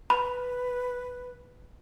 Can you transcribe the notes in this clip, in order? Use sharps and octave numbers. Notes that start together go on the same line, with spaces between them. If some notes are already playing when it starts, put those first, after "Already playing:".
B4 B5